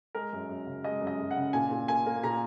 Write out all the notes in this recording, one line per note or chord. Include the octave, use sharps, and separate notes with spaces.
G#3 A#4
F#2
F#2
C#3
G#3 D#5
F#2
D#5
F#2
F#5
C#3
A#2 G#5
A#2
A#3 G#5
A#3
A#2 A#5